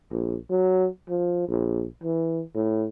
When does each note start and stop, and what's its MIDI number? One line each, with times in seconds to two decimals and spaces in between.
0.11 0.35 34
0.50 0.87 54
1.09 1.48 53
1.49 1.85 34
2.03 2.42 52
2.55 2.87 45